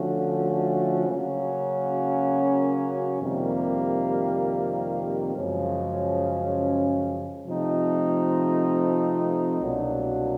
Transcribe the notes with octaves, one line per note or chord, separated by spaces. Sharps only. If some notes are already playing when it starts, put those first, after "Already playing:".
Already playing: D3 F3 A3 C#4 F#4
C#3 F#3 A#3 C#4 F#4
F2 C3 D#3 G3 A#3
F#2 C#3 F3 G#3 C#4
C3 F3 A3 C4 D#4
C2 B2 F#3 A#3 D4